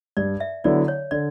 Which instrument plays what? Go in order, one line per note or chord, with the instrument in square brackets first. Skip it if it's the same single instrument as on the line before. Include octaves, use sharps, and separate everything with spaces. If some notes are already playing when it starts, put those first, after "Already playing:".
[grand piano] G2 [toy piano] D5
[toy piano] E5
[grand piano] D3 F#3 B3 E4 [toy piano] D5
[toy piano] C#5
[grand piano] D3 [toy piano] D5